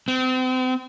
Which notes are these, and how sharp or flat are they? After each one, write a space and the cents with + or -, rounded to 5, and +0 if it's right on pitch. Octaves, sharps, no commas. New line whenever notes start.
C4 -35